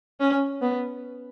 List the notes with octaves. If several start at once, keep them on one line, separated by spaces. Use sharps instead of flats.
C#4
B3